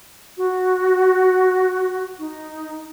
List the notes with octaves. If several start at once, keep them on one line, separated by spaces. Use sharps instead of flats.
F#4
D#4